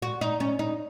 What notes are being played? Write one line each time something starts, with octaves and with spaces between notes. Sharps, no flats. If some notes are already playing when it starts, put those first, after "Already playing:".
F#4
D#4
C#4
D#4